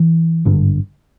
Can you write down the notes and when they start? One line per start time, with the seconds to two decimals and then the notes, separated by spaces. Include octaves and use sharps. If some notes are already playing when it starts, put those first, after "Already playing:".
Already playing: E3
0.45 G#1 G2 D3